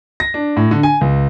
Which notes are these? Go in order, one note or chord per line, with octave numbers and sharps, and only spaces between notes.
A#6
D4
A2
D3
G#5
C#2